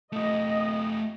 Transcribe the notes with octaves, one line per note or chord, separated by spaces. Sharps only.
A3 F4 D#5